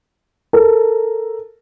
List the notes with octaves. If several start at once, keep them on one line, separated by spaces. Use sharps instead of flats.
A4 A#4